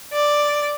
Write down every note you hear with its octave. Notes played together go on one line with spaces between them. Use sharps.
D5